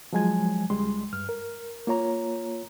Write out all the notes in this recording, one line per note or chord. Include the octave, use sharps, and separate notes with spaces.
F3 F#3 G#3 G#5 G#6
C#2 G3 G#3 C6
G2 F6
A#4
A#3 F4 C#5 A#5